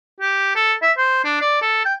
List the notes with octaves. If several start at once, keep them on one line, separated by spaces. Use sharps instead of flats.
G4
A4
E5
C5
D4
D5
A4
G5